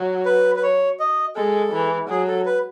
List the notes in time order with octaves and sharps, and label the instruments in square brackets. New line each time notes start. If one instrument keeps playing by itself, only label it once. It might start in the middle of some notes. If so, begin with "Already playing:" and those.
Already playing: [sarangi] F#3
[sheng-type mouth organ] B4
B4
C#5
D#5
[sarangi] G#3 [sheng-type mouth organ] A4
[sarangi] E3
[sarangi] F#3 [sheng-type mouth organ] G#4
[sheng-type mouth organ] A4
B4